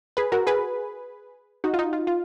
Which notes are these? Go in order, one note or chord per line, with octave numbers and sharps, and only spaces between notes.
G#4 B4
F#4 A#4
G#4 B4
D#4 F#4
F4
D#4
F4
F4